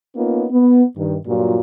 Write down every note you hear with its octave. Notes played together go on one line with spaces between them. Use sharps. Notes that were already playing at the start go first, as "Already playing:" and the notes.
A#3 B3 C#4 D#4 F4
B3
G2 D#3
G2 A#2 F#3 F4 F#4